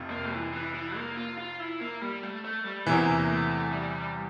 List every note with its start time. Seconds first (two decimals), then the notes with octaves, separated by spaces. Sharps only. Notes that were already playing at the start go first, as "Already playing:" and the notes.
Already playing: F1 F2 C3 F3
0.10 A#3
0.32 E3
0.53 E3
0.75 E3
0.96 A#3
1.17 F4
1.38 F4
1.60 E4
1.81 A#3
2.01 G3
2.23 A3
2.45 A3
2.65 G3
2.87 E2 C3 E3 A#3
3.29 A3
3.72 G3